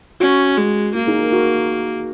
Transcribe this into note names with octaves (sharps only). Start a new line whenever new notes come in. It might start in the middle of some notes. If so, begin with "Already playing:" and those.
C#4 F#4
G#3
A#3 F#4
D#4 G#4
F#4 A#4
F#4 A#4